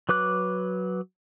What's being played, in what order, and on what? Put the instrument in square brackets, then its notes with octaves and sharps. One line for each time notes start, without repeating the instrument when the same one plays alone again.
[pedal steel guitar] F#3 B4 D6 F#6